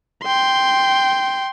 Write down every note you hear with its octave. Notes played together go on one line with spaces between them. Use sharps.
G5 C6